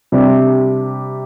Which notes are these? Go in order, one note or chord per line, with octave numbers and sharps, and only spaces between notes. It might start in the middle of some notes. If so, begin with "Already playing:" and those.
C3 G3 D4 G4